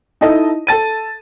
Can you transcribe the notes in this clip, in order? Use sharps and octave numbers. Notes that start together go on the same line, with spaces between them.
D#4 E4 A4 D#5 A5
A4 A5 A6 D#7